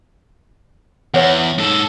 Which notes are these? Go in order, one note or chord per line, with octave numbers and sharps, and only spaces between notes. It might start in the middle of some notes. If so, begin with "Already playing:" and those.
E2 C#5 F#5
G#2 A4